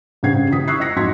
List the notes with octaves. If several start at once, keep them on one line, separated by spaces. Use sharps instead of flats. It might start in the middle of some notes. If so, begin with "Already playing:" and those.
G2 C#3 C4 F#5 G#6 C7
F#1 F4 D#6 B6
C#6 D#6 E6 F#6 G#6 C7
D#5 D#6 E6 A#6 C#7
F2 G#2 F#3 C6 G#6 B6